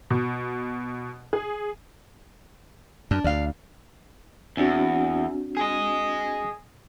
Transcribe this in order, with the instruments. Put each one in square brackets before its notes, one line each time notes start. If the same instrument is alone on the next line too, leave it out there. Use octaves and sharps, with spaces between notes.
[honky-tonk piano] B2
G#4
[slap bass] F#2 [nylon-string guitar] D4
[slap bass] D2 [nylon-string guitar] D5 F5
[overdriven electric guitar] E2 [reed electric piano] C4 D4 F#4
[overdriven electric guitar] G#4 D#5